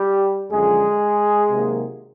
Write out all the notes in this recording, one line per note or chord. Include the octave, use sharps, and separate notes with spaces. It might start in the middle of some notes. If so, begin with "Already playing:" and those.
Already playing: G3 G4
F#2 D3 F3 G#3 G#4
C3 D#3 F#3 A#3